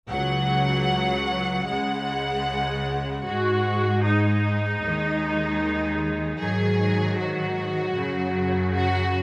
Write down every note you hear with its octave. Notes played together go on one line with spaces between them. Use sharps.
C#2 C#3 F#3 F#5
C#2 C#3 G#3 F#5
G#2 G#3 F#4
D#4
D#2 D#3 G#3
G#2 D#3 F#3 G#4
F#4
F#2 C#3 F#3
F#4